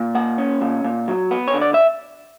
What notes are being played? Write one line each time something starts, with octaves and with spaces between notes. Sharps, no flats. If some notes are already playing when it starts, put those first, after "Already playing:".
Already playing: A#2
A#3 F#5
C#4
A#2
A#2
F#3
B3
C#5
D3
D5
E5